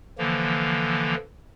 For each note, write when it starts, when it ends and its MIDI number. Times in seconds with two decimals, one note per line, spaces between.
0.18 1.15 50
0.18 1.15 52
0.18 1.15 53
0.18 1.15 58